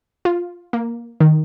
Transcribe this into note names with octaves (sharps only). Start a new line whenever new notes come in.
F4
A#3
D#3